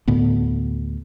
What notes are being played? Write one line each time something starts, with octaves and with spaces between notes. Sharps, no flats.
D2 A2 D3 B3